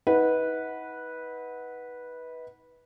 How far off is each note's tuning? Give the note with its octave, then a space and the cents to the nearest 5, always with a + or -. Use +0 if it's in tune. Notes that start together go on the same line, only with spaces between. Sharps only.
D#4 +45 B4 -10 F#5 +0